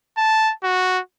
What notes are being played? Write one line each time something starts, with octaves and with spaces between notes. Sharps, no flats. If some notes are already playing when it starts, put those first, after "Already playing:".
A5
F#4